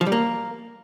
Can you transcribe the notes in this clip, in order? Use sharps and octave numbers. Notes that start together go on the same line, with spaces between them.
F3
G3
A#3